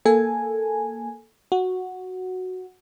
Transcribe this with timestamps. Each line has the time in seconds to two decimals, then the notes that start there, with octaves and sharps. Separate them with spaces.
0.05 A#3 A4 G#5
1.52 F#4